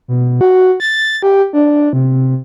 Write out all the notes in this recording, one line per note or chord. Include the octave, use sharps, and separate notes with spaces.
B2
F#4
A6
G4
D4
C3